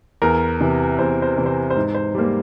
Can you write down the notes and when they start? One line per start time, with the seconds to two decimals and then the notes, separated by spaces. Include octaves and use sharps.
0.22 E2 A#4
0.61 C3 E3
0.99 E2 C5
1.22 C5
1.37 C3 E3
1.46 C5
1.70 C5
1.76 G#2
1.95 C5
2.15 G3 A#3 C5